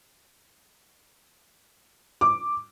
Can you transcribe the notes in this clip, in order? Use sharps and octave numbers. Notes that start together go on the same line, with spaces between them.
D6